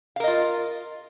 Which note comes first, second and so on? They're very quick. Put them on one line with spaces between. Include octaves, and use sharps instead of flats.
F5 A#4 D#5 F4